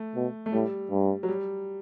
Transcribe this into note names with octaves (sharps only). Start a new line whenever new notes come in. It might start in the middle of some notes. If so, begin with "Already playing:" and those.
Already playing: A3
B2
A3
A2 G3
G2
F#3
G3